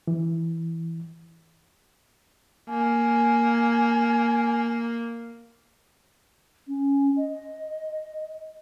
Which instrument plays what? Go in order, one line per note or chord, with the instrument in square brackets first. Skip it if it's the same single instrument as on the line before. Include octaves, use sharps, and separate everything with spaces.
[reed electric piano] E3
[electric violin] A#3 [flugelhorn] G#5
[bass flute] C#4
D#5